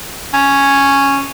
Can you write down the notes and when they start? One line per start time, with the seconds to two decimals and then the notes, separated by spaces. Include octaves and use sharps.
0.34 C#4